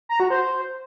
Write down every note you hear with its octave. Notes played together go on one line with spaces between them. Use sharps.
A#5
F#4
C5